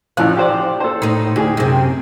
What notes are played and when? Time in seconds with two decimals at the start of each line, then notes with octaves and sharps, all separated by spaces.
0.17 A1 F3 F5 F#6
0.37 G4 C5 D5
0.80 A4 C5
1.02 A2 D#4
1.36 D2 G4 G#4
1.57 F#2 C3